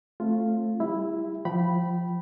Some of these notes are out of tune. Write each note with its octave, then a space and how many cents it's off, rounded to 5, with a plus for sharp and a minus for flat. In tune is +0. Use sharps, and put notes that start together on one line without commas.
A3 +0 C4 +30 F4 +0
G3 +0 E4 +0 G4 +40
F3 +0 G5 -25 B5 -5